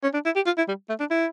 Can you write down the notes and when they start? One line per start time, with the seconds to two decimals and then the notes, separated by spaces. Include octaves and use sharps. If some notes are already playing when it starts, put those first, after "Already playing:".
0.03 C#4
0.14 D4
0.25 E4
0.36 G4
0.46 F4
0.58 E4
0.68 G3
0.89 A3
1.00 D4
1.11 E4